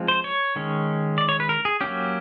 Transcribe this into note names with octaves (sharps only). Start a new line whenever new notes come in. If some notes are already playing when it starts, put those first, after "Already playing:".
Already playing: F3 G#3 C4
C5
C#5
D#3 G#3 C#4
D5
C#5
B4
A#4
G#4
F#3 A#3 C#4 G4